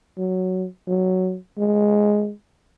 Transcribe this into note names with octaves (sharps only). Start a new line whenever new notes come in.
F#3
F#3
G#3